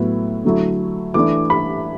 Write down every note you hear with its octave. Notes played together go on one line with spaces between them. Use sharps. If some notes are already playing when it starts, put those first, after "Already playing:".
Already playing: A2 F#3 B3 E4
D3 F#3 A3 E4
E3 A3 D4 D6
B5